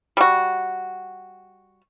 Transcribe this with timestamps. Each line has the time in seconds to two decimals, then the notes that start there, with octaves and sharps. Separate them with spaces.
0.17 G3 F#4